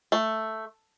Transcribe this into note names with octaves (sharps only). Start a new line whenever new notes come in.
A3